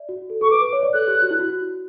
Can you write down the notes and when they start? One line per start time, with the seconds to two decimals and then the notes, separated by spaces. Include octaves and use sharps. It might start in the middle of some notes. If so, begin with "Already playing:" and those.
Already playing: D5 E5
0.09 F#4
0.30 A4
0.41 A4 C#6
0.51 B4 D6
0.62 B4
0.73 C#5
0.83 D5
0.93 A4 F#6
1.08 G4
1.22 F#4
1.31 E4
1.40 F#4